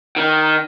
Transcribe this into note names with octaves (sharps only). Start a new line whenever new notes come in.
D#3